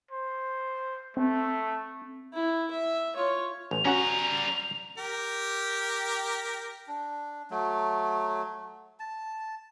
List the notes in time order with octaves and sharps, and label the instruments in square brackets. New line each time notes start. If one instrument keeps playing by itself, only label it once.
[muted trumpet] C5
[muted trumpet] A3 [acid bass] C4
[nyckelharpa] E4
E5
F4 C#5
[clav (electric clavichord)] A1 [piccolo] F7
[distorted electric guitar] G3 A#5 [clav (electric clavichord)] C#4 F#4 F#5
[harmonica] G4 A#4
[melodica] D4
F#3 A3
A5